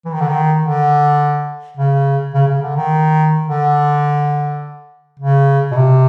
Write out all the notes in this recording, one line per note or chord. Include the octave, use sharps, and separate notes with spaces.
E3
D#3
D3
D#3
D3
C#3
C#3
C#3
D3
D#3
D3
C#3
B2
C3